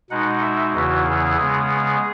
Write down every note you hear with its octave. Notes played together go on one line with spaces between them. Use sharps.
B2 G#3 D#4 F#5
E5
E2 C#3 E3 B3 E4 F#4
G#4
C#3 G#3 B3 G#4